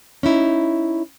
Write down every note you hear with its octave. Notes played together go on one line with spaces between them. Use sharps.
C#4 D#4 E4